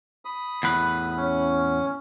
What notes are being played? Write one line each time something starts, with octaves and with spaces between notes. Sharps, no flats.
B5 D#6
E2 A2 B4
C#4